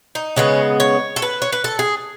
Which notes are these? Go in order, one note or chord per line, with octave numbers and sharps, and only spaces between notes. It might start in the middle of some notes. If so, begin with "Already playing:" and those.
D#4
C#3 G#3 B3 C#4
C#5
A4
B4
C#5
B4
A4
G#4